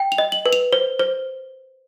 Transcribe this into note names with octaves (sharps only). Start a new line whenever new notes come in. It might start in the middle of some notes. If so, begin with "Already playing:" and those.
Already playing: G5
F7
D#5
F#7
B4
F7
C5
C5